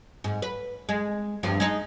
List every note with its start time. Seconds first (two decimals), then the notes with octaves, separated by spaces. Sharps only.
0.24 G#2
0.42 B4
0.89 G#3
1.43 E2 G2 F3
1.60 G#3 D#4